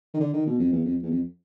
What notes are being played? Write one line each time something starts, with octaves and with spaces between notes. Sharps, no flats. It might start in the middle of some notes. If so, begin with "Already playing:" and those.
D#3
D3
D#3
B2
F2
E2
F2
E2
F2